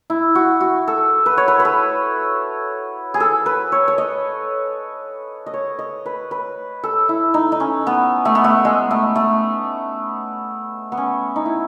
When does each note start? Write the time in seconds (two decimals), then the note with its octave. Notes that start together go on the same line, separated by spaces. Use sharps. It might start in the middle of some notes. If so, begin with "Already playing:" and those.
0.10 E4
0.35 F#4
0.61 F#4
0.88 A4
1.26 B4
1.37 C#5
1.48 B4
1.60 B4
1.65 A4
3.14 G#4
3.20 A4
3.46 B4
3.72 C#5
3.88 C#5
3.98 D#5
5.46 D#5
5.54 C#5
5.79 D#5
6.06 B4
6.31 B4
6.84 A4
7.09 E4
7.34 D#4
7.52 D#4
7.60 C#4
7.87 B3
8.25 A3
8.35 B3
8.44 A3
8.65 G#3
8.91 A3
9.16 A3
10.92 B3
10.97 C#4
11.36 D#4
11.45 E4